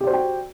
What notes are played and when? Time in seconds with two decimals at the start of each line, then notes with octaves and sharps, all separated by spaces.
0.01 G4
0.04 D5
0.07 C5
0.10 F#4
0.13 G5